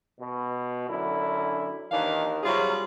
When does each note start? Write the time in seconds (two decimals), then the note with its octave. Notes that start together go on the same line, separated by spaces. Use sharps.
0.20 B2
0.88 F#2 D3 E4
1.91 D#2 D#3 E3 D4 F5
2.43 C3 F#3 G3 F4 G#4